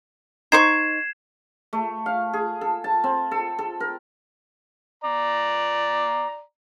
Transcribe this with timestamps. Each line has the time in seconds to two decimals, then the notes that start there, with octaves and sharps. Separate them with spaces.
0.52 D#4 C5 C#6 G#6 C7 E7
1.73 A3
2.06 F5
2.33 G#4
2.61 A4
2.84 A5
3.04 C4
3.31 A4
3.59 A4
3.80 A#4
5.04 D5 A#5